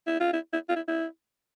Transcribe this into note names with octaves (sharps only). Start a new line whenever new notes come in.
E4
F4
E4
E4
F4
E4
E4